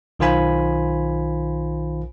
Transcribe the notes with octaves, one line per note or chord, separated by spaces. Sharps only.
B1 D#3 F4 C5 G#5 B5